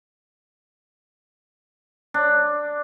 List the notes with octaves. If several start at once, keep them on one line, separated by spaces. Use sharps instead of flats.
D4